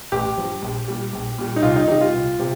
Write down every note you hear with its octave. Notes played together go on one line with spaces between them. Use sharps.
A1 G4
G2 F3
A#1
A#2 G3
A#1
A#2 G3
D#4
C2 F4
D#4
C3 D#3 G3 D#4
F4
C2
C3